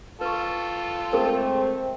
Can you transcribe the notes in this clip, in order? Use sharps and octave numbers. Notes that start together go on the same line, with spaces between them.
F4 A4 B4 C#6
G#3 A3 C4 G#4 A#4 C5